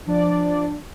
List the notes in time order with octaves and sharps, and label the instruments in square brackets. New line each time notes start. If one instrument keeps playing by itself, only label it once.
[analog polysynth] F3 D5 [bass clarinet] D4